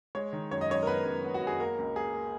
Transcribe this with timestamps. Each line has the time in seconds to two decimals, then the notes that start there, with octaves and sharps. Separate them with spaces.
0.15 G#3 C#5
0.33 D#3
0.51 F#2 C#5
0.61 D#5
0.70 F#2 C#5
0.83 A#4
0.87 B3 B4
1.05 F#2
1.24 B3
1.34 F#4
1.42 F#2
1.47 G#4
1.60 A#3 A#4
1.78 C#2
1.96 A#3 G#4
2.14 A#3